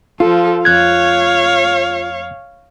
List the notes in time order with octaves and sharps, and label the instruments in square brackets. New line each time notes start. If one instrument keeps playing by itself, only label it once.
[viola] F3 A4 [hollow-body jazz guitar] F4
[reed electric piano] F2 F#6 G#6 [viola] C#5 F5